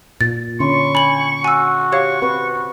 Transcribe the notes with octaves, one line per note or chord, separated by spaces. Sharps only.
A#2 A6
D3 C#4 C6 C#6
G#5 B5 F#7
F#4 G#5 E6
G4 C#5 F5 C#6
C4 F#4 B4